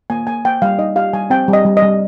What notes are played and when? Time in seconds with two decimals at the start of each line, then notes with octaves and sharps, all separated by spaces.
0.10 A#3 G#5
0.27 A#3 G#5
0.45 A#3 G5
0.62 G3 F5
0.79 D#4 D#5
0.96 G4 F5
1.13 G3 G#5
1.30 C4 G5
1.48 G3
1.53 D#5
1.65 G3
1.77 D#5
1.82 G3